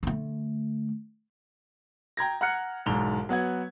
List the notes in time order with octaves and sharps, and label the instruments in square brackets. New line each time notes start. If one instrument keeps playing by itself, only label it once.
[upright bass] D3 A3
[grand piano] G5 A#5 G#6 A#6
F#5 A#5 F6 F#6 C#7
E1 B1 G#2 F7 G7
F#3 B3 F#5 G#6